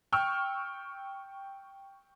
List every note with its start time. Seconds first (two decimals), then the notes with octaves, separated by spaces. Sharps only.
0.12 G5 C#6 E6 F6